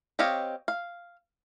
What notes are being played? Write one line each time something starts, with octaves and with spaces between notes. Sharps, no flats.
C4 G4 C#5 D#5 F5
F5